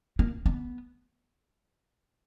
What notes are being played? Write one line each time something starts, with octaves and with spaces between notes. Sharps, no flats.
A#3
B3